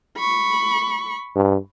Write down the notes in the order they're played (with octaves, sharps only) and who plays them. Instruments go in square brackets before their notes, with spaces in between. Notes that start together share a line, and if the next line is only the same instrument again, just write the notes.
[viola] B5 C#6
[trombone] G2